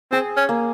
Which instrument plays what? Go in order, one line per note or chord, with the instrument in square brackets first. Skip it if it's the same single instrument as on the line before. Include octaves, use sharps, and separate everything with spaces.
[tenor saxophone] C4 [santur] G#4
[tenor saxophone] C#4
[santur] A#3